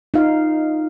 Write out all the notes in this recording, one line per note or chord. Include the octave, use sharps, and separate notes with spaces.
D#4 F4 F5